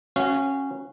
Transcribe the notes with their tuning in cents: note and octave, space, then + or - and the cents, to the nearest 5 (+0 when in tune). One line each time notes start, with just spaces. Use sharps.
C#4 -15 F#4 +0 F5 -25